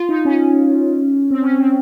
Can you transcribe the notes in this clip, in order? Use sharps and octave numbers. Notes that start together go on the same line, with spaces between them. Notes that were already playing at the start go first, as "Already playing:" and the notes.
Already playing: F4
D#4
C#4
C4
C#4
C4